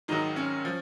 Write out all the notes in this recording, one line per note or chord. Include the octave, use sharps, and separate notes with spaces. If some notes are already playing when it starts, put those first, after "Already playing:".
G#1 G#2 D#3 F#3 D#4
C#4
F3